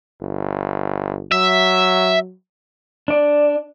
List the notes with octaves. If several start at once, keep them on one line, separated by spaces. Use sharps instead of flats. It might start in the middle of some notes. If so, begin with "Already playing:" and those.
G1
F#3 E5
D4 D5